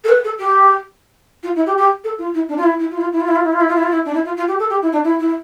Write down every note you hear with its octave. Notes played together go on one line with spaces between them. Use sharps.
A4
B4
A4
G4
F4
E4
G4
G4
A4
F4
E4
D4
F4
E4
E4
F4
E4
F4
E4
F4
E4
F4
E4
F4
E4
F4
E4
F4
E4
D4
E4
F4
F4
G4
A4
G4
E4
D4
E4
E4